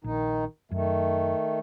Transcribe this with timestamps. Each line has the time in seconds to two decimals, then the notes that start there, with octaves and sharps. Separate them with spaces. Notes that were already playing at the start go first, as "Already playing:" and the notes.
0.04 A#1 D#3 D#4
0.71 F#2 D#3 A3